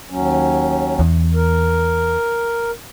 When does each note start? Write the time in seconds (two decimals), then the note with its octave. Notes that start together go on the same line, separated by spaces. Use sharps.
0.10 D#2 F#3 C#4
0.99 E2
1.34 A#4